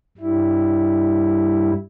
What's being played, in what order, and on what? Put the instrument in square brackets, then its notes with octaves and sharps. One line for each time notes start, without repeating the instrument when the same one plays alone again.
[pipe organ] G2 G3 E4